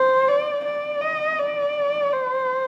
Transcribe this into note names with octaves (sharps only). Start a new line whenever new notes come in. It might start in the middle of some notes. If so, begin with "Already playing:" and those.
Already playing: C5
D5
D5
D#5
D5
C5